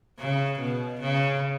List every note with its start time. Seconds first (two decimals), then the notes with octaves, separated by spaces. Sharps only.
0.19 C#3
0.60 B2
1.01 C#3